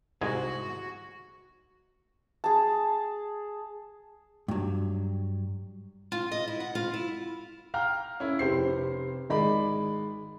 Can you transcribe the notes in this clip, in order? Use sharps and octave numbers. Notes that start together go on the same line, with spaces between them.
C2 G#2 F#4 G#4
G#4 A5
G2 F#3
F4
D#5
E4
F#5
F4
E4
F5 G5 A#5 F6
C#4 E4
F1 C3 G4 C5 C7
G#1 G#3 D5 B5